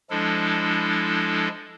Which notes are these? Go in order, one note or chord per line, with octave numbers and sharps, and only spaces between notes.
F3 G#3 D4 E4 A4